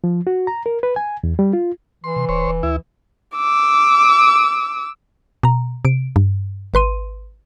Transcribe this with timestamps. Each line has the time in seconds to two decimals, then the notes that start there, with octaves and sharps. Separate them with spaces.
0.04 F3
0.27 F#4
0.47 A#5
0.66 A#4
0.83 B4
0.96 G#5
1.24 E2
1.39 G3
1.53 F4
2.04 E3 C6
2.16 C3
2.29 D#1 C5 C#5
2.48 E1
2.63 D2 E4
3.37 D6 E6
5.43 B2 A#5
5.85 C3 D7
6.16 G2
6.74 G#1 B4 C6 D#7